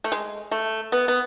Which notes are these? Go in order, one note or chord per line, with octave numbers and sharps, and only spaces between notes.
A3
G#3
A3
B3
B3